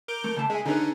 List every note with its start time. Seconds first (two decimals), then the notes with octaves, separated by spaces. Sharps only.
0.08 A#4 D6 G6
0.24 A3
0.36 C#3 A3 A5
0.50 G#3 E5 G#5
0.65 D3 C#4 D#4 G#4 B4